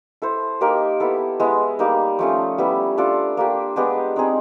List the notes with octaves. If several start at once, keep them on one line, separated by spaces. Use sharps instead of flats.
E4 A4 C5
A#3 D#4 G4 A#4
B3 E4 A4
G#3 B3 E4
G3 A#3 D#4
F3 A3 C#4
G3 B3 E4
D4 F4 A4 D5
A#3 D4 G4
G#3 B3 D4 G4
C4 D#4 G#4